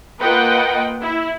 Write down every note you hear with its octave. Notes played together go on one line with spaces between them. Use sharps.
A#3 F4 B4 D#5 F#5 G5
E4